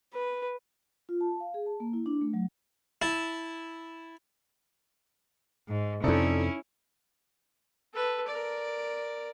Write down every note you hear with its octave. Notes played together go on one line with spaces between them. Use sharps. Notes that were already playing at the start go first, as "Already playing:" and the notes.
B4
F4
A5
F5
G#4
A5
A#3
E4
D4
A3
F#3
E4 A5
G#2
F2 C3 C#4 D#4 E4 A4 D5
A4 B4
A#4 D5